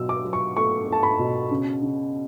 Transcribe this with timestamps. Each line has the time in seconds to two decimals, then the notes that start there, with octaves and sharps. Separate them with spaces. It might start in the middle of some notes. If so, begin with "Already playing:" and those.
Already playing: B2 F#3 E6
0.09 D6
0.25 F#3
0.33 C#6
0.56 A3 C#6
0.88 A3 A5
1.03 B5
1.19 B2
1.51 C#3
1.82 C#3